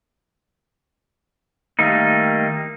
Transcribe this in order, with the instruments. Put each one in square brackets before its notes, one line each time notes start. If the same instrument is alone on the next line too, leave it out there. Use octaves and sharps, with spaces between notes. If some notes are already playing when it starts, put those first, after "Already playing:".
[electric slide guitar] D#3 G3 A3 A#3 D#4